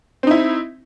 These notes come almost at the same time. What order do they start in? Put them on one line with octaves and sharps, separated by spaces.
C4 D#4 E4